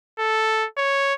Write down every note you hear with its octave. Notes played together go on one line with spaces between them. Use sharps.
A4
C#5